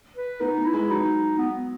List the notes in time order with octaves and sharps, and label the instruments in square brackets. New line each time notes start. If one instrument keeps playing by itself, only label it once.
[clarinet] B4
[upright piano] B3 [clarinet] D#4
[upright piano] B3
[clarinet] E4
[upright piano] G#3
[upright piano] F#3 [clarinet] D#4
[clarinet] B3